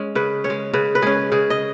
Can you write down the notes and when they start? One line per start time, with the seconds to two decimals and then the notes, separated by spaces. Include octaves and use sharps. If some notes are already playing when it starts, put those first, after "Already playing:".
Already playing: G#3 C#4 G#4
0.15 C#3 B4
0.44 C#4 C#5
0.50 G#3
0.73 C#3 B4
0.95 B4
1.02 G#3 C#4 G#4
1.32 C#3 G#4
1.50 D#5